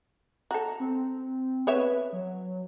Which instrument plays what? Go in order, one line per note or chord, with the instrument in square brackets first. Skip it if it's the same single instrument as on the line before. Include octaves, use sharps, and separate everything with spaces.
[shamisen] F#4 A4 [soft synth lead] A#5
[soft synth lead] C4
[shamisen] B3 C#5 E5 [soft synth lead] B4
[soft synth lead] F#3